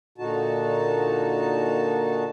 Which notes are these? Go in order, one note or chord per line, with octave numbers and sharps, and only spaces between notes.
A#2 D3 D#4 F#4 A5